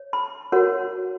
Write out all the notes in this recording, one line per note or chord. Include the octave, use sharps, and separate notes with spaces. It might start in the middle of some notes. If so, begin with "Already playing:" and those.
Already playing: C#5
B5
F#4 A#4 C#5 F#5